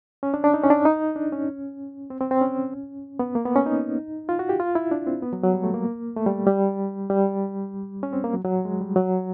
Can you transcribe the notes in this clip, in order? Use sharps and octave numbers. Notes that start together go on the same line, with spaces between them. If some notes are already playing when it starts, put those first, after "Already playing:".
C#4
D4
D4
D#4
C#4
D4
D#4
D4
C#4
C4
C4
C4
C#4
B3
A#3
B3
C#4
D#4
F4
F#4
G4
F4
E4
D4
C4
B3
F#3
F#3
G3
A3
A#3
A3
G3
G3
G3
C#4
C4
A#3
F#3
F#3
G#3
G3
F#3